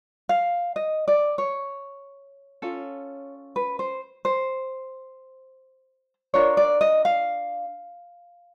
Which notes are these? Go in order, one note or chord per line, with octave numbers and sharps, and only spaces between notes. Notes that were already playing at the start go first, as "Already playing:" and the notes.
F5
D#5
D5
C#5
C#4 F4 A4
B4
C5
C5
D4 F4 A#4 C#5
D5
D#5
F5